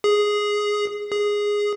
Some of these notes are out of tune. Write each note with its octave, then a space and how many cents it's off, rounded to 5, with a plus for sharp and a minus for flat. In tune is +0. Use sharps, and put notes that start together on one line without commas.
G#4 +0
G#4 -5